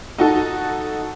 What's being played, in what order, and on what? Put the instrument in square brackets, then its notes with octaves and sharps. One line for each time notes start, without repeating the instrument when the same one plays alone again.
[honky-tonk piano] D#4 F#4 A4